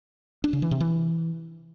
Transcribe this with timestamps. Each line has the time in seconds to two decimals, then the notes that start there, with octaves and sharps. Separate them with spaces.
0.44 D4
0.53 C#3
0.62 E3
0.71 C3
0.80 E3